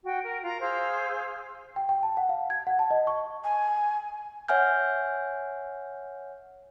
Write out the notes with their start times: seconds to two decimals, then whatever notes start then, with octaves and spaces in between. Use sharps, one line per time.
0.04 F#4 G5
0.25 A#4
0.42 F4 A#5
0.61 G#4 C5 F5 E6
1.76 G5
1.89 G5
2.03 A5
2.17 F#5
2.29 F5
2.50 G#6
2.67 F#5
2.79 A5
2.91 D#5
3.07 C#6
3.44 G#5
4.48 C#5 E5 F#5 G#5 F6 G6